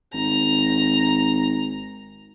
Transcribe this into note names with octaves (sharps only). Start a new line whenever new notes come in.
G#1 A#5